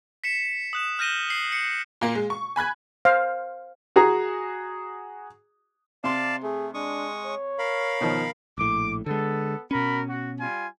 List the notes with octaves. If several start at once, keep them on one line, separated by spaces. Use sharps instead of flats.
B6 C#7 E7
D#6 F#6 E7
F6 G6 A#6 D#7 E7 G7
C7 F#7
C7 C#7
A#2 A#3
G#3
C#6
G#5 B5 F#6 G#6
C5 F5
F#4 G#4 A#5
C3 D5 F5 A5 C6
A3 G#4
G#3 D4 C#6 D#6
C#5
A#4 F5 B5
B2 D#3 F3
A#1 A2 D6
D3 G#3 B3 A4
B2 C#4 F#4 A#4 B5
F#4
G3 F4 G#5